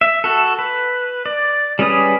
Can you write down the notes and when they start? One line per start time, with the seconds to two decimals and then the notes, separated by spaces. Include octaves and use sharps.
0.01 E5
0.24 F#4 A4
0.59 B4
1.26 D5
1.79 G3 C#4 G#4 B4 D#6